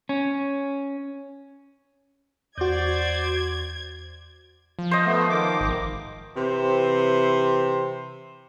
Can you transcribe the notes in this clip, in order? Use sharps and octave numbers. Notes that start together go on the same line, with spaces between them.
C#4
E2 F#4 C5 D5 G6 G#6
F3
C5 D#5
A3 B3
D#3 D6
G#1
C3 E3 C5